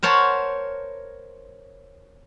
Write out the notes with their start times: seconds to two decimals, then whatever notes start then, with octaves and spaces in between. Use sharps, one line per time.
0.03 A#4 C5 C#5 F#5 A5 B5